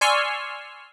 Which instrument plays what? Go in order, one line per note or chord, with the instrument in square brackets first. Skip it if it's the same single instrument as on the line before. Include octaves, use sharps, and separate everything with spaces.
[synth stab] D5 G#5 C6 C#6 E6 F6